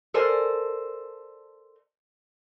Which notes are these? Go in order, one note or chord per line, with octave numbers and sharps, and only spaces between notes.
A4 A#4 C5 D5 G#5